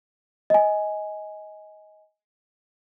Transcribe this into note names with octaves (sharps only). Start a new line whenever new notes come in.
D#5 G#5